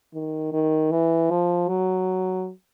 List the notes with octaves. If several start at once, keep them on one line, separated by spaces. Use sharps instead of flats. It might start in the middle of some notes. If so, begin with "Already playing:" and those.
D#3
D#3
E3
F3
F#3